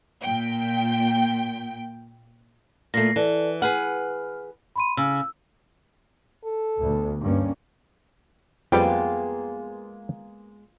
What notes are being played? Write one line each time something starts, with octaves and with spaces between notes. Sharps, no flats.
A#2 G5
A#2 A3 A#6 C7
E3 A4 D5 A5
G#4 B4 F#5 F6
B5 C6 D#7
C#3 E6
A4
D2 B2
G2 A#3 C#4
F2 G3 G#3 A#3 B3 F4 G5